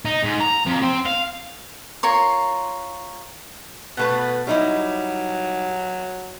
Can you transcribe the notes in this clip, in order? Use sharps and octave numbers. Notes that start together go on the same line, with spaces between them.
D#4
G#2
A#5
F2
C4
F5
F4 A#4 C#5 C6
B2 A3 B3 B4
F#3 G3 D#4 E4